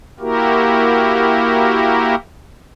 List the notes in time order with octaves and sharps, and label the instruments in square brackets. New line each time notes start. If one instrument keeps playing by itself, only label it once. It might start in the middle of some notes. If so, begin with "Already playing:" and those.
[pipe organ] A#3 E4 F#4 G4 A#4